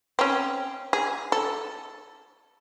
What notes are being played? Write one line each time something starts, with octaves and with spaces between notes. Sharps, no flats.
C4 C#4
G#4
A4